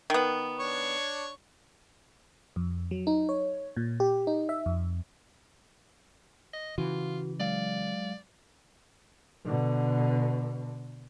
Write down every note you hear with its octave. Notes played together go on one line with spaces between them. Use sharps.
D#3 B3
D4 C#5 C#6
F2
F#3
D#4
C#5
A#2
G4
D#4
E5
F2
D#5
C#3 E3 F4 F#4
F#3 G#3 D5 F5
B2 D3